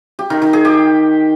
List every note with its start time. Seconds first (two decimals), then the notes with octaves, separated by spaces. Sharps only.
0.19 G4
0.30 D#3
0.42 D#3
0.53 G#4
0.65 G4